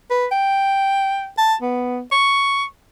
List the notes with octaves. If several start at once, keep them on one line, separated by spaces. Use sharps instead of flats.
B4
G5
A5
B3
C#6